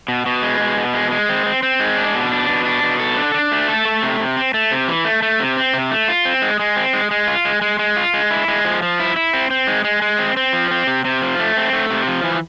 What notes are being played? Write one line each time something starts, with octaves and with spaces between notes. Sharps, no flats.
B2
B2
G#3
B2
B2
G#3
G#3
C4
C4
C4
G#3
D4
B2
D4
B2
D4
B2
A4
D4
D4
A3
A4
A3
C3
C3
C4
A3
C3
E3
A3
A3
C3
C4
C3
A3
F4
C4
G#3
G#3
C4
G#3
G#3
F4
G#3
G#3
G#3
F4
G#3
E4
G#3
F3
F3
E4
E4
C4
C4
G#3
G#3
G#3
C4
C4
F3
C4
C3
C3
F3
A3
C4
A3
C3
F3
E3